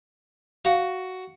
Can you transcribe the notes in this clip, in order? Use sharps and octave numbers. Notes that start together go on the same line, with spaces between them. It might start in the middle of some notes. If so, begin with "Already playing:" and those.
F#4 F5